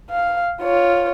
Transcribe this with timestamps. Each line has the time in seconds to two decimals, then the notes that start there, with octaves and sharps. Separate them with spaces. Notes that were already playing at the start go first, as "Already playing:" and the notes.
0.10 F5
0.62 F4 C#5